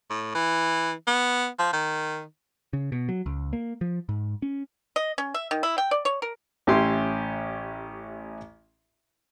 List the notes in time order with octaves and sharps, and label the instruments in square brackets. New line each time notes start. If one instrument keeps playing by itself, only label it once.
[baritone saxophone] A2
E3
B3
F3
D#3
[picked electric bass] C#3
B2
F#3
C#2
A#3
F3
G#2
C#4
[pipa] D#5
C#4
E5
D#3
E4
G5
D5
C#5
A#4
[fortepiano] A1 C#4 E4 G4 C6